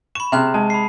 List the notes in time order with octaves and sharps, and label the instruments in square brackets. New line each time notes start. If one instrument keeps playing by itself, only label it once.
[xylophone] B5 C#6 [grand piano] E7
[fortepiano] C3 [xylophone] G#4 F6 F#6
[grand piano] G#3 [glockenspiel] A5
[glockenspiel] B5 C7